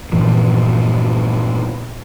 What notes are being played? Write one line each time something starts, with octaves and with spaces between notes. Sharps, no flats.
G2 A#2 E3 F3